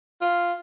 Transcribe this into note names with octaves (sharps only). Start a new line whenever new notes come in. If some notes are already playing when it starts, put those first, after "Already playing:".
F4